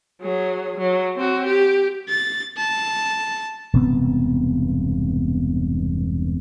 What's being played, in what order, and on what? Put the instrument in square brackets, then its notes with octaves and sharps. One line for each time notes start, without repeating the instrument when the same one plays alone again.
[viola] F#3 G#4
F#3
C4 F#4
G4
[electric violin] A6
A5
[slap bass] E1 G2 C3 B3